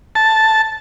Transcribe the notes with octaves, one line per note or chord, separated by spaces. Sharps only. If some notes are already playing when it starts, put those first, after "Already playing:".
A5